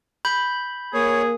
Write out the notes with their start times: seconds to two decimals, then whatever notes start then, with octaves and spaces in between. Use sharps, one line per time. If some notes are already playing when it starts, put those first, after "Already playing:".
0.25 B5 G6
0.94 A#3 G#4 C#5